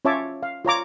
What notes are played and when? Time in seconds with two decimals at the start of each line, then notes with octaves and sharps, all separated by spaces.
0.05 C#4 F4 C#5 E5 A5 D6
0.43 F5
0.65 F4 C#5 A#5 D6